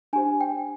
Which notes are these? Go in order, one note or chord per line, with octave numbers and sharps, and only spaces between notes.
D4 G4 C5 G#5
G5